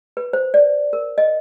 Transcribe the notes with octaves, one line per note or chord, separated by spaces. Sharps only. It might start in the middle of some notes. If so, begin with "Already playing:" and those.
B4
C5
D5
A#4
D#5